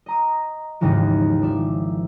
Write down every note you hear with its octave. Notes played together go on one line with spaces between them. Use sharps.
D#5 A#5 D#6
G#1 D#2 G#2 C#3 E3 F3
F3 D5 E5